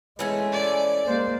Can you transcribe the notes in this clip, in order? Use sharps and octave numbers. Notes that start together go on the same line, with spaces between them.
E3 G#3 A3 C#4 G#5
D5
G#3 A#3 C5